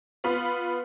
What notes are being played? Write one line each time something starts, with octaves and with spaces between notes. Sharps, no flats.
B3 F4 B5